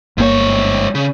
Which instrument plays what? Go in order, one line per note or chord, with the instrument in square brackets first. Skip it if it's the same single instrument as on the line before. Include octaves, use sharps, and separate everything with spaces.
[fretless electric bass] G1 A#3 [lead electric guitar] G#2 C#5
[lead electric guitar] C#3